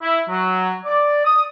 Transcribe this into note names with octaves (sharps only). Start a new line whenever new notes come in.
E4
F#3
D5
D#6